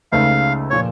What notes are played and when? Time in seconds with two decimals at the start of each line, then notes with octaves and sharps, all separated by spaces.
0.12 C#2 C#3 A3 D#4 F5
0.70 A#2 F3 C#5